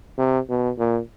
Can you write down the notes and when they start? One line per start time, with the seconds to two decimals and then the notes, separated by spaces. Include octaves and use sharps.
0.18 C3
0.49 B2
0.78 A#2